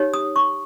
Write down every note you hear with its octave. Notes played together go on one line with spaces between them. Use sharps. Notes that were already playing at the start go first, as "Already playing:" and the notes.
Already playing: D#4 G4 C#5
D#6
C#6